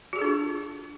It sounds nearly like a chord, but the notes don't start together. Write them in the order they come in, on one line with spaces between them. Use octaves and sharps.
F#4 G#4 A4 D4 F4